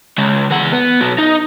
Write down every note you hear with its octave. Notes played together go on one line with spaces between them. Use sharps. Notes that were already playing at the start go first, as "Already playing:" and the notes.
C#3 G#3
E3 F#5
B3
B2 F#3
D#4